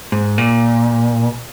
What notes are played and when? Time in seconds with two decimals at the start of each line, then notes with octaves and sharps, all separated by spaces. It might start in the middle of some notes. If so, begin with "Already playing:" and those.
0.12 G#2
0.38 A#2